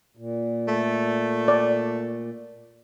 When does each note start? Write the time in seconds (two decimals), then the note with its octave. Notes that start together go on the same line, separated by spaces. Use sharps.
0.17 A#2
0.68 A3
1.48 D5